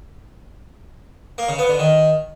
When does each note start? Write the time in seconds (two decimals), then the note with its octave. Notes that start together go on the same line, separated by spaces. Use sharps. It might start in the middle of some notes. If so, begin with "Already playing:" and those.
1.38 A#3
1.49 C#3
1.59 B3
1.69 D3
1.79 D#3